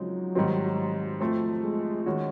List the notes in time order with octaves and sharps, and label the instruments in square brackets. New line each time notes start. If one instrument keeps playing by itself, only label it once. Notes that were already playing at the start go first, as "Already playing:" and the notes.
Already playing: [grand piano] C#3 F3 G#3 C4 D#4 [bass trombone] F#3
[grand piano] G#2 D#3 G3 C4
F3 A3 C4
[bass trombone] G#3
[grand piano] D#3 G#3 C#4 F#4